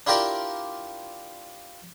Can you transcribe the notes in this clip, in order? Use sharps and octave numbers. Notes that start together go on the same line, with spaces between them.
D4 E4 F4 G4 A#4 D5